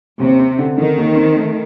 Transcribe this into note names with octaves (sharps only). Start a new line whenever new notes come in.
D#2 C3
C4
D3
D3 D#3
D#2
C4
A3